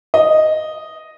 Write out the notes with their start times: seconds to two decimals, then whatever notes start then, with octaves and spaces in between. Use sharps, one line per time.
0.14 D#5